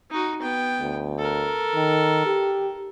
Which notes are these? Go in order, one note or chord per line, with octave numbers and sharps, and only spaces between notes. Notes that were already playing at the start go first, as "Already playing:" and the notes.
D#4 F#4
B3 G5
D2
A4 A#4
D#3
G4